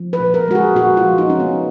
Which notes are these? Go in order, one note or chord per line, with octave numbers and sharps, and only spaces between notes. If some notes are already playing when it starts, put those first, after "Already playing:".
Already playing: F3
B4
A#2
A#4
G#3 F#4
G#4
A#2 F#4
F4
F3
D#4
A#2 C#4
B3